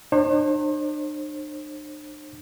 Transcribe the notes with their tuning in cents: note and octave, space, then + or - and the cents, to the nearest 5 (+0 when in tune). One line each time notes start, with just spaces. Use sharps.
D4 +45 C5 +45